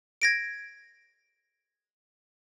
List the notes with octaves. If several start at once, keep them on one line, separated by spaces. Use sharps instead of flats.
G#6 A#6 D7